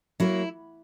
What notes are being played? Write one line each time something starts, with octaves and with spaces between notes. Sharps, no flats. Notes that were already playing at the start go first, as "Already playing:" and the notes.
F#3 A#3 E4